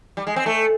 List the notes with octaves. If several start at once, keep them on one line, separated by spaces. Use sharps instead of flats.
G3
G#3
C4
A3